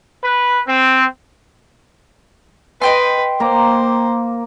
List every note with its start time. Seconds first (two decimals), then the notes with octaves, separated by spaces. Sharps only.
0.23 B4
0.67 C4
2.82 B4 D#5 G5 C6
3.40 A#3 C5 A#5 D6